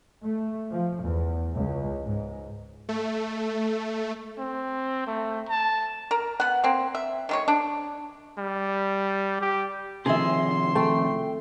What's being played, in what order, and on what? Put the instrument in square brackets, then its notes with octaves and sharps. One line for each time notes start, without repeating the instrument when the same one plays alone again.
[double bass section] A3
F3
E2
C#2
G#2
[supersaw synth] A3
[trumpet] C4
A3
A5
[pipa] A#4
B3 F#5
A#3 C4
E5
D#3 G#3 C#5
D4
[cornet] G3
G4
[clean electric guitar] C3 D#3 F3 [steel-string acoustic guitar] G#4 E5 [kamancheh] C6
[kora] A3 [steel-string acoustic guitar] G5